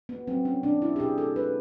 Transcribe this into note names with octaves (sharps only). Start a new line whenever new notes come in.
B3
F#3 C4
C#4
B2 D4
E4
G4
B2 G#4
A4
G#3 B4